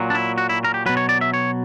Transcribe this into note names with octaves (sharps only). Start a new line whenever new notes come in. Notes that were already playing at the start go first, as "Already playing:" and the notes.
Already playing: A#2 F#3
D4
E4
F#4
E4
A#4
G4
B2 F#3 B4
C#5
D5
E5
C#5